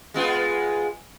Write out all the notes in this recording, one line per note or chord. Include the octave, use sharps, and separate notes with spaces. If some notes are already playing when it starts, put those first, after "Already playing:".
G#3 B3 F4